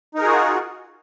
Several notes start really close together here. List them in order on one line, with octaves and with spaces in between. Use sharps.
D#4 A#4 G#4 F#4 F4